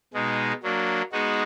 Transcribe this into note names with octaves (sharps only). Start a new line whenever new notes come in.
B2 G#3 D#4
F#3 A#3 D4
G#3 B3 D#4 F#4